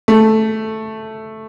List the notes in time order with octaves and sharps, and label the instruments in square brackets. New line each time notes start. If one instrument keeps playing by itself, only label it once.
[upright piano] A3